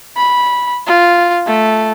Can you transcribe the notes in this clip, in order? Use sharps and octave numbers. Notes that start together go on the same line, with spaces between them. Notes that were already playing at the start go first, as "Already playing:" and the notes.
B5
F4
A3